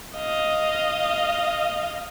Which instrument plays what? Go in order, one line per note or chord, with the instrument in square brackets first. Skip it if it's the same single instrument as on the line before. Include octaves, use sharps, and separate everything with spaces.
[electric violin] D#5 F5